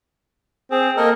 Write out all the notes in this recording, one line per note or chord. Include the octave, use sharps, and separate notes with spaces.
C4 G#4
A#3 A4 A#4 D#5